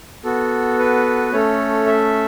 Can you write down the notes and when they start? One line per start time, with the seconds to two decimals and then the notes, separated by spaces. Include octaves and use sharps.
0.24 B3 F#4 A4
0.79 B4
1.33 A3 C#4 A4 C#5
1.86 E5